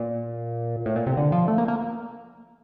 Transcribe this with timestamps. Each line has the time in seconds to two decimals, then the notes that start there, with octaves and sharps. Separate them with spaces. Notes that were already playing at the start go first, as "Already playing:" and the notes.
Already playing: A#2
0.86 A2
0.96 A#2
1.06 C3
1.17 D3
1.32 F3
1.48 A3
1.58 A#3
1.68 A#3